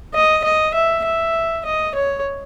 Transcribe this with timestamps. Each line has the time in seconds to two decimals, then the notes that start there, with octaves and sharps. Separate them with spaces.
0.14 D#5
0.44 D#5
0.74 E5
1.05 E5
1.65 D#5
1.94 C#5